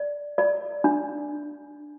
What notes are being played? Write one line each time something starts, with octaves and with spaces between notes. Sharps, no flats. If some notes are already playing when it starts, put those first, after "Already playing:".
Already playing: D5
D5
D4